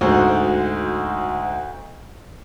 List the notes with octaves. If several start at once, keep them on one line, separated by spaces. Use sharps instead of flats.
D2 G#2 F#4 C5